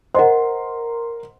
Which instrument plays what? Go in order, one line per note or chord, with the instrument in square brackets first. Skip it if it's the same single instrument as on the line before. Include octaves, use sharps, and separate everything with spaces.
[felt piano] A#4 C6 [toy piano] C5 D#5 F#5